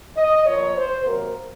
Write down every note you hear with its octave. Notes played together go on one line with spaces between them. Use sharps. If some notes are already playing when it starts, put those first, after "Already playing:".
D#5
A#2 F3 A#3 C#5
C5
C3 F#3 A#3 A#4